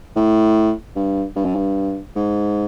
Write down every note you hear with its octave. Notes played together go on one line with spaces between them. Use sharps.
A2
G2
G2
F#2
G2
G#2